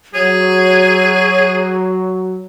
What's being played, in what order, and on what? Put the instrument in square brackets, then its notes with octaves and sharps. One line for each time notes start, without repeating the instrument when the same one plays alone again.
[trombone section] F#3 [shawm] G#4 [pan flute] C#5